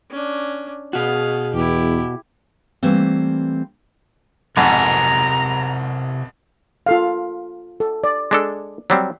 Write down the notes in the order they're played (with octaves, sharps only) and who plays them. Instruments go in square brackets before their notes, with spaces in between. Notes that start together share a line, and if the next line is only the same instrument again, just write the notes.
[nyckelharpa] C#4 D4
[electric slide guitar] B2 F#4 [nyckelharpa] G#4 F5
[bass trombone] E2 [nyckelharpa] E4 G4
[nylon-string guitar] E3 G3 A3 A#3 C4
[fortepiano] B1 F2 G#2 [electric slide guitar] C3 A#4 G#5 [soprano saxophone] A#5
[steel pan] F4 A4 F5
A4
D5
[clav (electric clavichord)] G#3 D4 A4
F#3 G3 C4